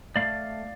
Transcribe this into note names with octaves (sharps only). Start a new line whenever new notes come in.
A3 D5 F5